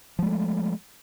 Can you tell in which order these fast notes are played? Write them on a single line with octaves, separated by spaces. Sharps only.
F3 G#3 A3